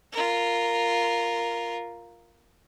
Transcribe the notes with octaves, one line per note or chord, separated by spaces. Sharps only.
F4 A#4